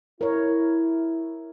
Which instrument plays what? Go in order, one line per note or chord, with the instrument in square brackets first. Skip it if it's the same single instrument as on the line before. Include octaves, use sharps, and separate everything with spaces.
[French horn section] E4 [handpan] A#4 C#5